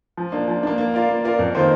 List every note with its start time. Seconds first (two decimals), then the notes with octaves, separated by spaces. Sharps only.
0.17 F3
0.32 A#3 D4
0.48 F3
0.63 A#3 D4
0.78 A#3
0.94 F4 A#4 D5 F5
1.09 A#3
1.24 F4 A#4 D5 F5
1.39 F2
1.55 D#3 A#3 F4 C5